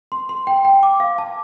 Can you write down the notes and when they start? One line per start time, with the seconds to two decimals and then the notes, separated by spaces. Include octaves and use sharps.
0.12 C6
0.29 C6
0.47 G5
0.65 G5
0.83 D6
1.00 F5
1.18 A5